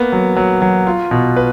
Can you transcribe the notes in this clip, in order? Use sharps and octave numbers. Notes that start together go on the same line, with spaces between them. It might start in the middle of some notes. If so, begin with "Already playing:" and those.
Already playing: A#3 B3
F#3
F#3
F#3
F4
B2
B4